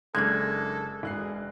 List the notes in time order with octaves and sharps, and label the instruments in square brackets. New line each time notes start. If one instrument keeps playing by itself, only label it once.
[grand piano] F#1 D4 F#6 [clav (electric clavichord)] G#3 A#3 [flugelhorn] A4 [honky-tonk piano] G#6
[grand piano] E1 F#6 C7 [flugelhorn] G#4